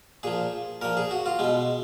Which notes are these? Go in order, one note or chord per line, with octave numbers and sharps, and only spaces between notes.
A#2 F3 G#4
A#2 F3 A#4
G#4
F#4
F4
B2 G#3